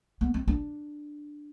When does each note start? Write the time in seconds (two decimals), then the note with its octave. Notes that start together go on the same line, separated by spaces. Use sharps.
0.21 B3
0.34 C4
0.48 D4